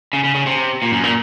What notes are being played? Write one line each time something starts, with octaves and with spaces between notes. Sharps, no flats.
C#3
C#3
C#3
C3
A#2
F#2
A#2